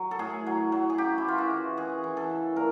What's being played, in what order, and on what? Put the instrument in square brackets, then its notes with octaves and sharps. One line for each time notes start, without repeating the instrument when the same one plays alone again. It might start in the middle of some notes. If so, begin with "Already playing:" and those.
Already playing: [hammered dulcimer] F#3
A4
A2 G#4
F#3
F#3
G#4
C#3 G4
E4
E3 F4
F#4
E3
E3 G#4
E3
A4
C#3
A#2 A#4